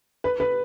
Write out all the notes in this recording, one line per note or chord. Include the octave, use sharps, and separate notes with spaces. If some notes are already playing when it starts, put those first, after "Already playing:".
B4
B4